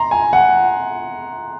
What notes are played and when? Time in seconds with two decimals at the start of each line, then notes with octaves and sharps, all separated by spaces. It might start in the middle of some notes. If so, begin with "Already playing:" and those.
Already playing: A#5 C6
0.11 G#5
0.33 F#5